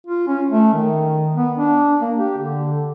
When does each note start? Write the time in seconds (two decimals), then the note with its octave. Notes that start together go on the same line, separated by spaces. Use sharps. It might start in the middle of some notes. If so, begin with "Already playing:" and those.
0.07 F4
0.28 C#4
0.51 A3
0.74 D#3
1.35 B3
1.58 D4
2.01 A#3
2.17 G4
2.38 D3